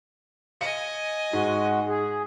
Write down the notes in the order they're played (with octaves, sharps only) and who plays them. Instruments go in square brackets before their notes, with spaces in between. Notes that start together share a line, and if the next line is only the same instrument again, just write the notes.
[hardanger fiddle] D#5 G#5 [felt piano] F5 C#7
[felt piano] G#2 [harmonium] G#3 F#4
[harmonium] G#4